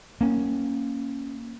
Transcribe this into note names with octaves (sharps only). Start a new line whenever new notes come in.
A#3 C#4